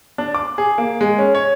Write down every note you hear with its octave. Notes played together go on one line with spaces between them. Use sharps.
D4
D6
G#4
A#3
G#3
C#4
C#5